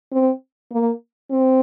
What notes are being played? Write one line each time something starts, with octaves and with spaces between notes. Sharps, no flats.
C4
A#3
C4